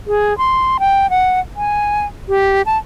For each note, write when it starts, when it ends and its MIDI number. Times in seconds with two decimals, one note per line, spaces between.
0.07 0.36 68
0.38 0.78 84
0.80 1.10 79
1.10 1.40 78
1.56 2.06 80
2.29 2.62 67
2.66 2.78 81